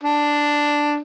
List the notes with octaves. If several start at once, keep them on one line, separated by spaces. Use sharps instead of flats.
D4